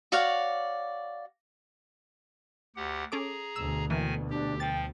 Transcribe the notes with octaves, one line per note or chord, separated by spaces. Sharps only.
F#4 C#5 D5 F5
D2 G4 F#5
C#4 G#4 A4 A#5 D6
D2 B2 E6
D#3 E3 A#3 G#5
D4 G4
F3 G5 A6